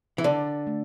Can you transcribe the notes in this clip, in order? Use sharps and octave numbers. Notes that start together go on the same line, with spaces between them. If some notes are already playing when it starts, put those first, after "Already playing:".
E3
D3 D5
A3